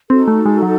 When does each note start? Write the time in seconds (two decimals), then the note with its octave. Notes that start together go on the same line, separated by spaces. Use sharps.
0.10 C4 D#4 F#4 A4
0.28 A3
0.46 G#3
0.63 F#3